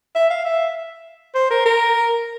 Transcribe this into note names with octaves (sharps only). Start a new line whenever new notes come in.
E5
F5
E5
C5
A#4
A#4